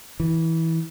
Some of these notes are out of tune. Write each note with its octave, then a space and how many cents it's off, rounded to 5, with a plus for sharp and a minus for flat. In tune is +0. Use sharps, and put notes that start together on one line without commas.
E3 -20